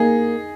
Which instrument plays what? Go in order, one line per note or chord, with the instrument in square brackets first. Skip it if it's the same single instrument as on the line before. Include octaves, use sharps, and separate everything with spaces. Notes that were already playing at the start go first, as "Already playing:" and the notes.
Already playing: [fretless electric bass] A#3 [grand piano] D#4 G#4